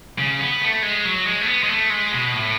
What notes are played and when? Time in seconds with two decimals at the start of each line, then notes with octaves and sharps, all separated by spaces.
0.19 C#3
0.41 B3
0.61 A3
0.83 G#3
1.05 F#3
1.26 G#3
1.41 A3
1.47 B3
1.63 G#3
1.69 A3
1.90 G#3
2.12 B2
2.33 A2